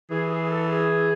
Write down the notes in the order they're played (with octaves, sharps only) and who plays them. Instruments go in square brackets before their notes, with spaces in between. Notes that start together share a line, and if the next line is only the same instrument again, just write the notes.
[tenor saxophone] E3 [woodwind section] G#4
[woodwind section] G#4
A4
G#4